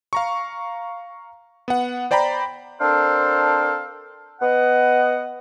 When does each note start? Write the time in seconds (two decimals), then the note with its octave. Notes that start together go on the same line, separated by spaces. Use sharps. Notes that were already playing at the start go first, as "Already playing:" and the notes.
0.13 F5 A#5 C#6
1.68 B3 F#5
2.11 C5 D5 G5 A#5 B5
2.80 C4 D4 A4 A#4 C5 F5
4.41 B3 D#5 F#5